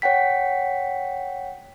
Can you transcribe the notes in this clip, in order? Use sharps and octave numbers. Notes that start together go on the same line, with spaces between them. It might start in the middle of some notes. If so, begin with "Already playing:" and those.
C#5 F#5 G5 B6